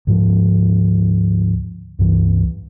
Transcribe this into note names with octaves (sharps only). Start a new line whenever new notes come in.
D2 G#2 F3
C#2 G2 E3